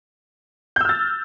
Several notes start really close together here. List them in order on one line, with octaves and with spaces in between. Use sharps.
G6 E6 F6 A6